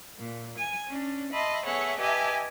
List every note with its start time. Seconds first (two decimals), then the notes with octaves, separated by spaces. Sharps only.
0.19 A#2
0.58 G#5
0.88 C#4 D4
1.32 D#5 E5 A5 B5 C6
1.65 B3 G#4 A4 C#5 E5 F#5
1.99 G4 B4 D#5 E5 G#5 A5